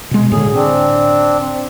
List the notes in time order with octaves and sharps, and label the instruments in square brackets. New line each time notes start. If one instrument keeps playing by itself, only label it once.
[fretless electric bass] B2 G#3
[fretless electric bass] A2 D3 [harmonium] G#4
[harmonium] C4 D4